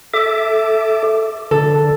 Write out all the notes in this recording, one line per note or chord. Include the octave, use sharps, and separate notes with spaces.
A4 E5 D6
D3 A4